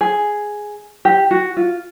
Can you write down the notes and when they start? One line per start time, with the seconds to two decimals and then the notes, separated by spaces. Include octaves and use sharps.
0.01 G#4
1.05 G4
1.31 F#4
1.57 F4